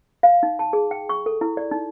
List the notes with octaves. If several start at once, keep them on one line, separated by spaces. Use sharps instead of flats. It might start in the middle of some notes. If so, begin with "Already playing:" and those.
F5
D#4
A5
G#4
G5
C#6
A4
E4
D5
D#4